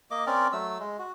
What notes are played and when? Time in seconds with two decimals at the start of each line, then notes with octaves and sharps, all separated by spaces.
0.11 A#3 D#5 D6
0.26 C4 C#4 A#4 D5
0.53 F#3 A3 E6
0.79 G#3
0.99 F#4